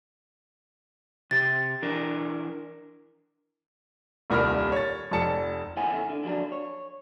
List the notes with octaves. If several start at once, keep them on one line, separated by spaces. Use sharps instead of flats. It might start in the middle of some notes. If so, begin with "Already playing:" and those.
C3 G4 A6
E3 D4 A#4
D#1 C2 A#4 D5 B5 F6
C#5 A6
F1 F2 A5 C#7
D2 E3 E4 C#5 F#5 G#5
E2 A2 C#3 A3
D3
D3 F3 F#3 D4
C#5